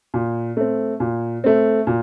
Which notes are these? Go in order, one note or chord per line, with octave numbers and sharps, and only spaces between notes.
A#2
A3 C4
A#2
A3 C4
A#2